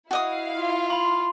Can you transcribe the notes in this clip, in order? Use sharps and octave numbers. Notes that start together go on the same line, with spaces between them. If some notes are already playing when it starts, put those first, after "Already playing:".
E4 F#4 D#5 F5 D#6
F4
B5 C6